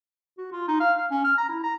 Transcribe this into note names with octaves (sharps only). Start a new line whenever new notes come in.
F#4
F4
D#4
F5
F5
C#4
F6
A#5
E4
A#5